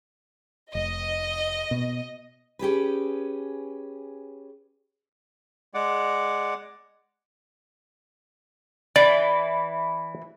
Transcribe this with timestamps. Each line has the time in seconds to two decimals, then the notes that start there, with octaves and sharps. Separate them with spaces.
0.75 F1 D#5
1.71 B2
2.59 C#4 G4 G#4 B4
5.74 G#3 D5 F#5
8.96 E3 D5